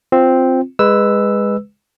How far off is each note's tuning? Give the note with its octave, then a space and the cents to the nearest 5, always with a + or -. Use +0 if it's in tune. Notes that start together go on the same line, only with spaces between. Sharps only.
C4 +0 F4 +0
G#3 -15 B4 +0 E6 +0